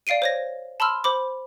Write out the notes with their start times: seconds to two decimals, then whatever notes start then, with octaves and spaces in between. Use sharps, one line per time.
0.07 D5 F5 C7 D7 D#7
0.22 C5 C#5 A#6
0.80 A5 B5 C6 E6 F6
1.04 C5 B5 D6